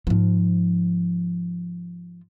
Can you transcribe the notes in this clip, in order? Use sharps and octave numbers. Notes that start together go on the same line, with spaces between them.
G#2 F3